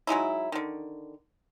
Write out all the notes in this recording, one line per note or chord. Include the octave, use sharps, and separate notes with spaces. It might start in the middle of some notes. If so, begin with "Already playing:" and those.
F#3 G#3 D#4 E4
D3 D#3